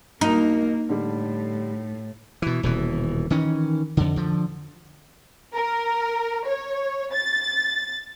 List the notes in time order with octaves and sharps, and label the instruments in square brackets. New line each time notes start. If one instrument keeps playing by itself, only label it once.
[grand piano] B1 A#4 [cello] A#3 [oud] D#4
[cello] A2 [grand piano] D3 G3
[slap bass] B2 E3
D#1 B2 E3
D#3 E3 C#4
F2 D3
D3 F3
[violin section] A#4
C#5
A6